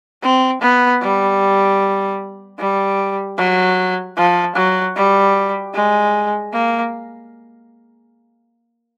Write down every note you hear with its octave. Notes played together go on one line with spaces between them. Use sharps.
C4
B3
G3
G3
F#3
F3
F#3
G3
G#3
A#3